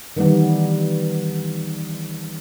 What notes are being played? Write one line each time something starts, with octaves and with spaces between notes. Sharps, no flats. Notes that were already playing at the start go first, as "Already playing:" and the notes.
D#3 E3 G3 B3